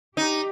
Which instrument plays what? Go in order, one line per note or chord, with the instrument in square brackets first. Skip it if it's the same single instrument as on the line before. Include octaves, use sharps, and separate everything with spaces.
[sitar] D#4 [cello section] G4